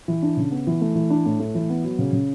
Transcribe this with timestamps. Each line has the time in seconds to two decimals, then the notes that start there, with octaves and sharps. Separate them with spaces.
0.08 E3
0.22 D4
0.37 C#3
0.51 B3
0.67 E3
0.81 A3
0.95 E3
1.10 D4
1.26 A2
1.40 A3
1.55 E3
1.70 B3
1.84 F#3
1.99 C#3
2.13 C#3